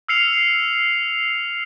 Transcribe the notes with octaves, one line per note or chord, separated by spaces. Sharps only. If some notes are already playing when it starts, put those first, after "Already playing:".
E6 F6 C7 C#7 F7